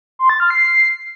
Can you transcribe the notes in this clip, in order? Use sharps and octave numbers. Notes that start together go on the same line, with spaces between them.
C6
A6
F6
C7